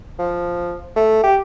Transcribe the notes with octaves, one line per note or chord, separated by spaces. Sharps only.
F3
A3
G4